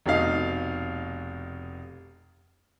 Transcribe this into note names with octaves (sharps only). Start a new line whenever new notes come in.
F1 B2 D#4 F5